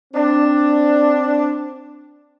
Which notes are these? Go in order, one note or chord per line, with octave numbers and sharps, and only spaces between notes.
C4 D4